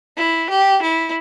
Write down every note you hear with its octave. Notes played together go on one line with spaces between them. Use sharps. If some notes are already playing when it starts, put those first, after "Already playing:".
E4
G4
E4